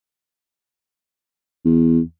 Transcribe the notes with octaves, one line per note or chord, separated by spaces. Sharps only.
E2